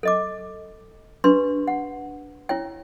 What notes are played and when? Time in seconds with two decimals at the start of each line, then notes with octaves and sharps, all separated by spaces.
0.03 A4 D#5 D6
1.24 D4 G4 B4 C6
1.68 F#5
2.49 E4 C#5 G5